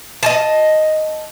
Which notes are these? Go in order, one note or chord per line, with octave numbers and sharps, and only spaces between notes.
D#5 G#5 A5